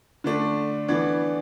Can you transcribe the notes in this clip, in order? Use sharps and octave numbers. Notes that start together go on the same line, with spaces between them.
D3 A3 D4
E3 B3 D4